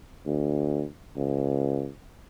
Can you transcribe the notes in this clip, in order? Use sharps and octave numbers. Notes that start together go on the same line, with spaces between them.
D2
C#2